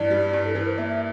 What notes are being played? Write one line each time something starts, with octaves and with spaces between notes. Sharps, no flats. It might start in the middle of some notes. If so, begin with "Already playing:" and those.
Already playing: G2 E3 D5
G3
G2
A4
E3 A#4
C5
A#3 E5
E5